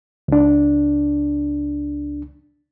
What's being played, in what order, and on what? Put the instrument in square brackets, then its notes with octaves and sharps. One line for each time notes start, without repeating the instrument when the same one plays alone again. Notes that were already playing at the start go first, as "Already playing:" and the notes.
[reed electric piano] C#2 D4